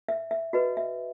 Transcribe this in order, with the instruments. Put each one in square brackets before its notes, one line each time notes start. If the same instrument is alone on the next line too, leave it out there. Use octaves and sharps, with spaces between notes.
[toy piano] E5
E5
F#4 B4 D#5
E5